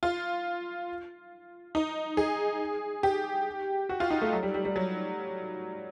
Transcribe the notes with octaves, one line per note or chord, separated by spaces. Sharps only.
F4
D#4
G#4
G4
F#4
F4
D#4
A3
F#3
G3
G3
G3
F#3